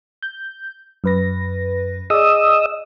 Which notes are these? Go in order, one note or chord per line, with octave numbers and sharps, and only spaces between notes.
G6
F#2 B4 A#6
G#4 D5 D#5 D#6 E6